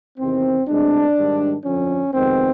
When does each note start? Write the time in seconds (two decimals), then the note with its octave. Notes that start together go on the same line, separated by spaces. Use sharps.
0.19 E2 C3 D#3 C4
0.67 C2 B2 G#3 C4 D4
1.17 G#2 D#3 G3
1.65 F2 D3 F3 C#4
2.13 F2 C3 D#3 G#3 B3 C4